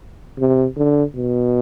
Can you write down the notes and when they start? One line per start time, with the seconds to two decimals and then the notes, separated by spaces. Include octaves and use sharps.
0.39 C3
0.77 D3
1.15 B2